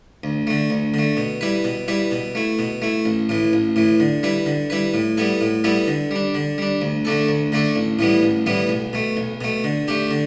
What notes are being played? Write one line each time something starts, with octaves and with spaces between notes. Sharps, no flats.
D2
D3 A3
D2
D3 A3
B2
G3 E4 B4
B2
G3 E4 B4
B2
A3 E4
B2
A3 E4
A1
A2 E3
A1
A2 E3
D3
G3 E4 B4
D3
G3 E4 B4
A2
G3 B3 E4 A4
A2
G3 B3 E4 A4
D3
G3 D4
D3
G3 D4
D2
D3 A3 D4 A4
D2
D3 A3 D4 A4
A1
A2 E3 G3 B3
A1
A2 E3 G3 B3
B1
B2 A3
B1
B2 A3
D3
A3 D4 G4
D3